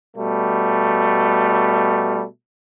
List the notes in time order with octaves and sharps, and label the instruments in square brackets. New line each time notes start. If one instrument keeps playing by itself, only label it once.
[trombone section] B2 G3 A3